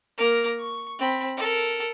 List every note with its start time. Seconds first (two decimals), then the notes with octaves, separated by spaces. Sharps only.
0.18 A#3 A#4
0.59 C#6
0.99 C4 B5
1.37 A4 A#4